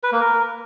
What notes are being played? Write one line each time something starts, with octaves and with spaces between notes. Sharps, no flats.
B4
A#3
A#4